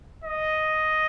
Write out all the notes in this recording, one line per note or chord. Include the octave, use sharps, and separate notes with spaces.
D#5